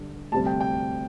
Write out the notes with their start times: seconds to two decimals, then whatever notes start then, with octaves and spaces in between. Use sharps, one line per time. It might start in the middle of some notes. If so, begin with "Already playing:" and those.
Already playing: G2 D3 G3 D4
0.32 D2 C3 G3 C4 A5
0.46 G5
0.61 G5